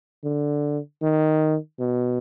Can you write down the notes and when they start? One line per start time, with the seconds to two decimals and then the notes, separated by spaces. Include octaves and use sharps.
0.24 D3
1.02 D#3
1.79 B2